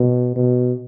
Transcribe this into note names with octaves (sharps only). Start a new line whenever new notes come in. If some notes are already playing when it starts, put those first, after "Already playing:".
Already playing: B2
B2